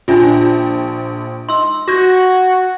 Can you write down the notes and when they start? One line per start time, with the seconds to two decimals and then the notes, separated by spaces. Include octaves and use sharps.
0.08 A#1 D4 F4 G5 A5
1.49 D#4 C6 E6
1.88 F#4 G6 G#6 A#6